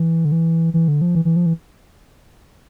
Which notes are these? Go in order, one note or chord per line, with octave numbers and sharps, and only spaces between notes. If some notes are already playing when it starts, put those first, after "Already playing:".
Already playing: E3
D3
E3
E3
D3
F3
E3
E3
F3
E3